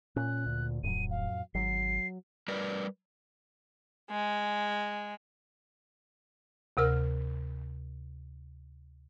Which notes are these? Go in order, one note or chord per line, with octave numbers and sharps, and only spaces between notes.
A#2 C#4 F#6
D2
D1 F2 A2 F#3 D#7
F5
G#1 F#3 C7
G3 A#4 B4 D5
G#3
D2 C3 A#4 F6